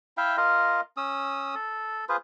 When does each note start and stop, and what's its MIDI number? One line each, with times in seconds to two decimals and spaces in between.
0.17 0.37 64
0.17 0.37 76
0.17 0.37 77
0.17 0.37 79
0.37 0.81 65
0.37 0.81 70
0.37 0.81 75
0.37 0.81 77
0.97 1.55 61
0.97 1.55 87
0.97 1.55 88
1.55 2.05 69
2.09 2.17 65
2.09 2.17 68
2.09 2.17 71
2.09 2.17 72